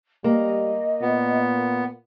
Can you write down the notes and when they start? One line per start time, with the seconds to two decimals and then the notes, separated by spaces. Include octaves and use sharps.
0.24 G3 A#3 D#5
1.01 A#2 B3